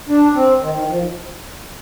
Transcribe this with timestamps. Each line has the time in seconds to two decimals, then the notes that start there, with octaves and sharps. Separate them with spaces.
0.09 D4
0.35 C4
0.61 D#3
0.75 D#3
0.89 F3